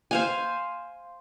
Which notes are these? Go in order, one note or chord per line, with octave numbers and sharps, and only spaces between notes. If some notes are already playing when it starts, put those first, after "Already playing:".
C5 F5 G#5